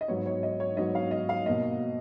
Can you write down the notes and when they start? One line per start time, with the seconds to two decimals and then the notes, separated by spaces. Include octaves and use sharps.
0.01 D#5
0.08 G#2 F#3 B3 C#5
0.26 C#5
0.43 D#5
0.60 C#5
0.77 G#2 F#3 B3 D#5
0.95 F5
1.11 D#5
1.29 F5
1.46 B2 A#3 D#5